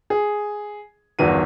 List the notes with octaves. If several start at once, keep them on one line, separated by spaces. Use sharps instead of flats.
G#4
G1 E2 D#3 F#4 D#7